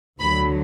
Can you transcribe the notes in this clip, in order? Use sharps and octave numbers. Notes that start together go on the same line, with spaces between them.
D2 D3 F#3 B5